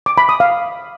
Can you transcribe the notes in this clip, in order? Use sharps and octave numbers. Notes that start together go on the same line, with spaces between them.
D6
B5
D#6
F5